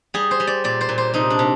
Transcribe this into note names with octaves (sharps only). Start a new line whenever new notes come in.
G3 G#4
C5
G3
D5
A#2 D5
C5
A#2
C5
C3 D#4
D4
C3